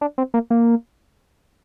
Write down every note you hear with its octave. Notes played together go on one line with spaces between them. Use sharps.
D4
C4
A#3
A#3